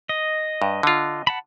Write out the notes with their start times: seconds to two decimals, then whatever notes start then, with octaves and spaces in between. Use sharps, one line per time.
0.09 D#5
0.62 G2
0.83 D3 F4
1.27 F#5 A5 B5